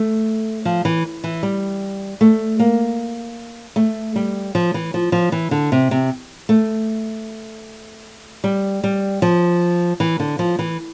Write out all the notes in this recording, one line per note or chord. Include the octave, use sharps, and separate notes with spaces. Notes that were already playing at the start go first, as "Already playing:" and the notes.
Already playing: A3
F3
E3
E3
G3
A3
A#3
A3
G3
F3
E3
F3
F3
E3
D3
C3
C3
A3
G3
G3
F3
E3
D3
F3
E3